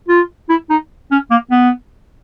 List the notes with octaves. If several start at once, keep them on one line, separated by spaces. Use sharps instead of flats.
F4
E4
D#4
C#4
A#3
B3